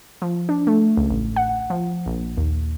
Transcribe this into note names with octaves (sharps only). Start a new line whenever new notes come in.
F3
D4
A3
C#2
A1
F#5
F3
A#1
D#2